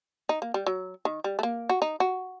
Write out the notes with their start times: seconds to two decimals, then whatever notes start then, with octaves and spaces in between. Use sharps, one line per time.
0.29 D#4
0.42 A#3
0.54 G3
0.66 F#3
1.05 D#3
1.24 G3
1.39 A3
1.43 A#3
1.69 F#4
1.82 D#4
2.00 F#4